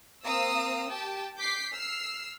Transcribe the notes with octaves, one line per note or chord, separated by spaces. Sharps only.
A#3 C4 F5 A#5 D#6 E6
G4 G5 A5
D6 G6 B6 C7
E6 F6 C7